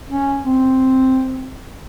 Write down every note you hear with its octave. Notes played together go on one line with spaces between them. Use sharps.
C#4
C4